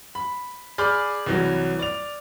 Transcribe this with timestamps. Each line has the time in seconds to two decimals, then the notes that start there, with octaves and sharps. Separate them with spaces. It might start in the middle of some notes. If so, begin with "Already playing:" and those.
0.15 B5
0.78 G#4 D5 B5 D6 F6 G6
1.26 C2 E3 F#3
1.79 D5 F7